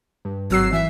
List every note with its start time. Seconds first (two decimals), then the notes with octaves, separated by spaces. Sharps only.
0.25 G2
0.51 G#1 F#3 E6 C7
0.73 E3 E5